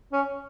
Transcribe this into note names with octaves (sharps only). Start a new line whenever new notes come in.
C#4